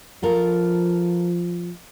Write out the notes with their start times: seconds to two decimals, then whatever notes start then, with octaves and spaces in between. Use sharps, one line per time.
0.23 F3 F4 A4 A#4